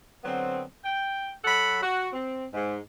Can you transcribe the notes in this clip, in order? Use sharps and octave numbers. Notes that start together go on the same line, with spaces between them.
D3 F#3 B3 C4
G5
F#3 F#4 A4 F#5 B5
F#4
C4
G#2